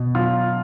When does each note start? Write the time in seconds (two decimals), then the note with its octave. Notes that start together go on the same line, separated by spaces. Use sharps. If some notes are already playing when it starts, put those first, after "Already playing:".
Already playing: B2
0.15 F#3 F4